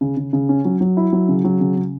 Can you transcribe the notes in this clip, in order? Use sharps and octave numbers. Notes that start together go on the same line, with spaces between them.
C#3
C#3
C#3
C#4
F#3
F#3
E4
F#3
C#3
F#3
C#3
C#3